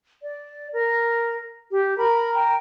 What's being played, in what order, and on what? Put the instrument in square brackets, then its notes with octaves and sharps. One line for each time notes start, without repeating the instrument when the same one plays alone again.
[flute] D5
A#4
G4
[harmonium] A#4 [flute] B5
[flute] G5